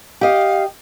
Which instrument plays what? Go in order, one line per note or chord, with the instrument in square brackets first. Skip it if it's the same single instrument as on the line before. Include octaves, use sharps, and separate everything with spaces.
[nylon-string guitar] G4 D#5 [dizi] F5